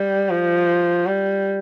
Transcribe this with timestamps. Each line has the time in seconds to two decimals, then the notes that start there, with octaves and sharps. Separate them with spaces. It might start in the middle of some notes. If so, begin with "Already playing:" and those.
Already playing: G3
0.29 F3
1.07 G3